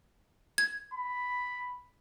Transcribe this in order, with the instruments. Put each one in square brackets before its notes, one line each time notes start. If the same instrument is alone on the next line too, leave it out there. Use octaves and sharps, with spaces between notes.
[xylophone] G#6
[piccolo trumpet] B5